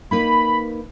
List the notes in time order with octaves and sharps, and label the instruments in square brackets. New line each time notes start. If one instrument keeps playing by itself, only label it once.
[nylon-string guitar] A#3 D#4 B4 [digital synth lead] B5